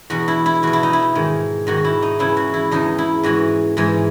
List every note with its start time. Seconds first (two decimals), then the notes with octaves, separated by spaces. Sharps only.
0.10 E2 B2 F#4
0.28 E4
0.46 E4
0.63 E2 B2 F#4
0.73 E4
0.83 D#4
0.93 E4
1.15 G#2 D#3
1.67 G#2 D#3 F#4
1.84 E4
2.02 D#4
2.19 E2 C#3 E3 E4
2.37 F#4
2.54 E4
2.71 E2 C#3 E3 D#4
2.98 E4
3.23 G#2 E3 F#4
3.77 G#2 E3